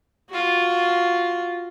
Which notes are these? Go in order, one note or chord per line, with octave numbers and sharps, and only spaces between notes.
F4 F#4